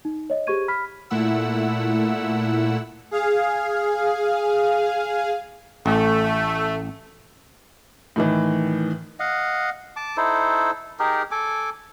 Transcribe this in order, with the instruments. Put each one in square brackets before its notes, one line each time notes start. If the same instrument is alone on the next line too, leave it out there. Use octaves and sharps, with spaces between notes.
[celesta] D#4
C#5 D#5
G4 G#4 C5 C#6 G#6 D#7
B5 F6 B6
[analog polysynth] A#2 A3 E4 F#5 E6
[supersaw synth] G#4 F5
[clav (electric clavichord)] A1 [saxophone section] A3
[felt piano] A2 D#3 E3
[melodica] D#5 F5 F#5
A5 D6
D#4 E4 A4 C5
D#4 G4 G#4 A#4
A4 G#5 D6